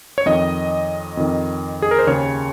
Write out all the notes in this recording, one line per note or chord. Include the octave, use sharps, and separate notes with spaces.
C#5
F2 D#3 D#5
F2 D#3
G#4
A#4
C5
D#2 C#3 C#5